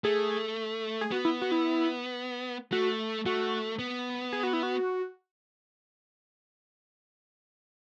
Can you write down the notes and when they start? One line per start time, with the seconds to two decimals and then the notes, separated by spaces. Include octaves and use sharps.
0.04 A3 G#4
1.01 G#4
1.11 B3 F#4
1.25 E4
1.42 F#4
1.52 E4
2.72 A3 F#4
3.26 A3 F#4
3.79 B3
4.33 G#4
4.43 F#4
4.53 E4
4.63 F#4